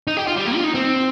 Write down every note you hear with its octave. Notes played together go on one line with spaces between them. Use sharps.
D#4
G4
F4
G3
A#3
F4
D#4
C4